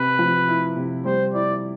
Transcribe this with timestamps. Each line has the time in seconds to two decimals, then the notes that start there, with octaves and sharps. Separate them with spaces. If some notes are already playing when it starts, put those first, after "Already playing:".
Already playing: C3 B4
0.19 F3
0.48 E4
0.77 C3
1.05 G3 C5
1.34 E4 D5